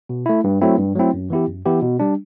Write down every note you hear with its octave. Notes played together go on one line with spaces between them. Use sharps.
B2
A3 E4
G2
F#3 A3 C4 E4
G2
F#3 A3 C4 E4
F#2
E3 B3 E4 G4
F#2
E3 B3 E4 G4
B2
G3 D4